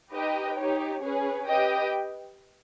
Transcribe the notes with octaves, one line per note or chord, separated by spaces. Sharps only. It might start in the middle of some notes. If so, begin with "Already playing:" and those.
D#4 G4 B4 D#5 G5
D#4 G4 C#5
C#4 G#4 B4
G4 B4 D#5 G5